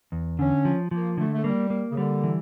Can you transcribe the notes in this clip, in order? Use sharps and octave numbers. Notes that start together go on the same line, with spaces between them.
E2
D3 C#4
F3
F3 A#3
D3 A3
A3
G3 A#3
A#3
C#3
D3 G3
E3